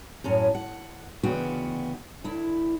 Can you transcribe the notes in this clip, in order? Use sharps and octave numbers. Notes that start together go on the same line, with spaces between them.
F#2 A2 C#4
F#5
D2 C#3 E3 B3 F#4 G5
D2 E4